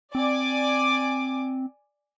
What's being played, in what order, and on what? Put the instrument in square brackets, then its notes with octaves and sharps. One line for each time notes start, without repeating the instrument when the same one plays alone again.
[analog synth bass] C4 [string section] D5 G#5 D6